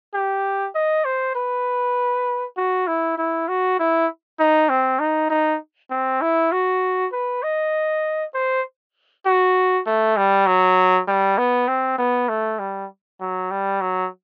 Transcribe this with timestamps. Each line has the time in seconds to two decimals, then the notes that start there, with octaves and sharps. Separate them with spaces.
0.14 G4
0.75 D#5
1.05 C5
1.36 B4
2.57 F#4
2.87 E4
3.18 E4
3.48 F#4
3.79 E4
4.40 D#4
4.69 C4
4.99 D#4
5.30 D#4
5.91 C4
6.22 E4
6.52 F#4
7.13 B4
7.43 D#5
8.34 C5
9.26 F#4
9.87 A3
10.17 G3
10.46 F#3
11.08 G3
11.38 B3
11.68 C4
11.98 B3
12.29 A3
12.59 G3
13.21 F#3
13.51 G3
13.81 F#3